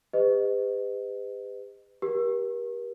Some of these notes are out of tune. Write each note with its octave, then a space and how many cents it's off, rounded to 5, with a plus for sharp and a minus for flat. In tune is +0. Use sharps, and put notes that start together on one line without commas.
G4 +40 B4 +35 D#5 -15
G4 +0 A#4 +40